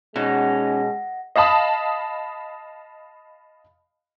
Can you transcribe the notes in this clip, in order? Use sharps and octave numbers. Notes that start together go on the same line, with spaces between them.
B2 G#3 C#4 D#4 D#5 F#5 A#6
D#5 F5 A5 B5 D#6